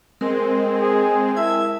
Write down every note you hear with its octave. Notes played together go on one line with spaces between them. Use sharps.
G#3 C4 A#4 C6
G#4
E4 A#4 E5 A5 G#6